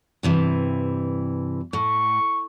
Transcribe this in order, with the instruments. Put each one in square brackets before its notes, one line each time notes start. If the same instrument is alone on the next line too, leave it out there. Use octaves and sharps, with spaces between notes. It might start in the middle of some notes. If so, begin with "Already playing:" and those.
[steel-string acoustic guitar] G2 C3 E3
[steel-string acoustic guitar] A2 [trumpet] C#6